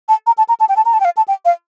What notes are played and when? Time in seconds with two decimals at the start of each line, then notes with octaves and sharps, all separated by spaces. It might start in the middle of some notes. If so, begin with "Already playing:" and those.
0.09 A5
0.27 A#5
0.38 A5
0.49 A#5
0.60 A5
0.69 G5
0.77 A5
0.85 A#5
0.93 A5
1.00 G5
1.05 F5
1.17 A5
1.28 G5
1.45 F5